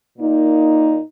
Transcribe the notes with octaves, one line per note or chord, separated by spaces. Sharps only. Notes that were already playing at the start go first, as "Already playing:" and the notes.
A#2 A#3 D#4